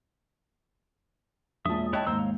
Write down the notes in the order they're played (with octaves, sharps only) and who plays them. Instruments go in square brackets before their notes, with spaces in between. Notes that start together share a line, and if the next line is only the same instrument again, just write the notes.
[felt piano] E1 A#2 A5 [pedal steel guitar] E5 D#6
[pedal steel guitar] E4 C#5 F#6 [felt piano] D#5 G5 A5
[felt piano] D#2 G#2 [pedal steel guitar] C5 A#5 E6
[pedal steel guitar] C#5 F5